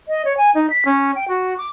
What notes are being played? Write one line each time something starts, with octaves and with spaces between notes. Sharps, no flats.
D#5
C#5
G#5
D#4
B6
C#4
G5
F#4
D6